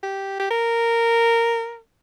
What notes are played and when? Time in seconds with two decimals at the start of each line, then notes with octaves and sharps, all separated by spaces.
0.03 G4
0.40 G4
0.50 A#4